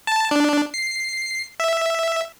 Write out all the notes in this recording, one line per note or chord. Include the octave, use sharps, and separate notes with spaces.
A5
D4
C7
E5